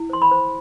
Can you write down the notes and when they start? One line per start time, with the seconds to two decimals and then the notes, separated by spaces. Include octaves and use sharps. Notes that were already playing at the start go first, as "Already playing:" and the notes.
Already playing: E4
0.10 C5 C6
0.22 B5
0.31 C5